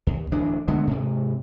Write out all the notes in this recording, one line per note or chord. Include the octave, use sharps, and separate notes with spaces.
D#2
D1 D2 E3 D4
D3 G#3 A3 B3
G#2 C3